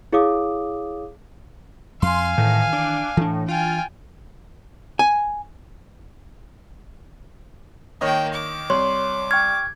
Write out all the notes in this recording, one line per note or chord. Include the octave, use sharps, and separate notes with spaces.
E4 G#4 C#5 F5 D6 D#6
F2 F5 G#5 C6
A2 D#3 E3
D4
A2 E3 D4
F4 G5 G#5
G#5
D#3 A#3 C#5 D#5 G5
D6
C2 C#5 C6
G5 C#6 F6 G#6